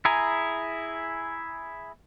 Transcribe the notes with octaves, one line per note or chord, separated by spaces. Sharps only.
E4 G#4 G#5 A#5